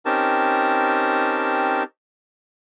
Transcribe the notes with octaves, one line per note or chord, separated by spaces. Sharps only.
C4 C#4 D#4 G4 A#4 A5